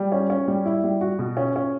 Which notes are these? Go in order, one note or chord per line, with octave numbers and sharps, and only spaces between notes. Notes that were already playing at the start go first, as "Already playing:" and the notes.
Already playing: G3
C#4
C#4
G3
E4
G3
F#4
B2
C#4
C#4